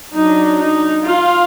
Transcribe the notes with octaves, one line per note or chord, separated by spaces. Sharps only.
F#3 D4 D#4
D#4
F4